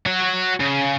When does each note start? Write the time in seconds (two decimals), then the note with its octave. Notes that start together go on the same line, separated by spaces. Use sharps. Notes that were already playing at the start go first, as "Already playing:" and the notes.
0.07 F#4 C#5
0.60 C#3